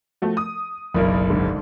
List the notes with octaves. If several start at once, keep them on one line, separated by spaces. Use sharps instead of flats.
F3 A3 F#4
D#6
F#1 B1 A#4 D5 B5
G#2 D3